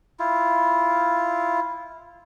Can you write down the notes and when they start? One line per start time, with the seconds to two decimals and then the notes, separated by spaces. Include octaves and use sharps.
0.19 E4 F4